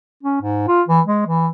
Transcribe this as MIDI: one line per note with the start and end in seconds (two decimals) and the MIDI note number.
0.23 0.41 61
0.42 0.64 44
0.68 0.82 65
0.88 1.00 52
1.07 1.23 56
1.26 1.49 52